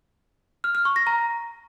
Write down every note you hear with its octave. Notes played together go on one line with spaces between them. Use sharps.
F6
F6
C#6
A#6
A#5